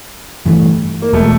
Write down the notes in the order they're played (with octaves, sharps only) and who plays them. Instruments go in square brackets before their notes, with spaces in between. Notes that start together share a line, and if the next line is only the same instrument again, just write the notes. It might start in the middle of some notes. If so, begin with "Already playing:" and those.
[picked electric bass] G2 E3 A3
[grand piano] A#3
[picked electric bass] E1 B2 G#3 [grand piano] A3